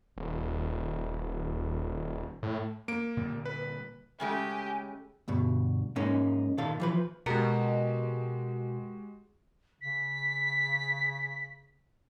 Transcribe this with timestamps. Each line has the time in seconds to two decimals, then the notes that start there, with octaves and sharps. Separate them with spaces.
0.17 D#1
2.43 A2
2.88 A#3 D7
3.17 A#2 D3 G3
3.45 B4
4.20 C#3 G#3 A3 G4 G#5
5.28 D2 G2 B2
5.96 G#2 G#3 A#3 C#4 D#4
6.58 A#2 D#3 A4 F5
6.80 E3 F3 B4
7.26 B2 G#3 F#4 G4 A#4
9.81 C#3 B6